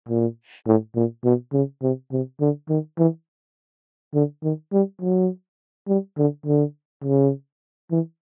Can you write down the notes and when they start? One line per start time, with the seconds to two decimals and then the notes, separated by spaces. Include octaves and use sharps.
0.09 A#2
0.67 A2
0.96 A#2
1.25 B2
1.53 C#3
1.82 C3
2.12 C3
2.41 D3
2.69 D#3
2.98 E3
4.14 D3
4.43 D#3
4.73 G3
5.02 F#3
5.88 G3
6.18 D3
6.46 D3
7.04 C#3
7.91 E3